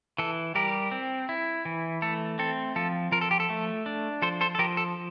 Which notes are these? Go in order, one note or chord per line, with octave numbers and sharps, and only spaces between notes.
E3 A4
G3 G4 A#4
C4
E4
E3
A3 A4
C4 A4
F3 A4
F3 A#4
A4
G4
A4
A3
D4
F3 A4 C5
A4 C5
A4
F3 G4 A#4
A4